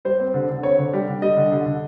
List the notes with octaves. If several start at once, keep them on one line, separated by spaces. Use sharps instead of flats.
G3 C5
C4
D3
D3
C4 C#5
D3
G3 D5
D3
G3 D#5
D3
D3
D3